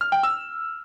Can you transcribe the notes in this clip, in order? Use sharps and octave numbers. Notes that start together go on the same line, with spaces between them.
F6
G5
E6